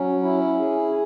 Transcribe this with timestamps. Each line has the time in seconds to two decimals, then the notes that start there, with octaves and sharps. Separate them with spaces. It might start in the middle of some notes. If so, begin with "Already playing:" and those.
Already playing: F#3 C#4
0.23 E4
0.59 G#4